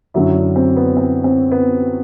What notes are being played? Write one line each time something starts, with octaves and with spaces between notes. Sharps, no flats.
F#2 D3 F#3 E4
D4
C4
B3
C4
C4
B3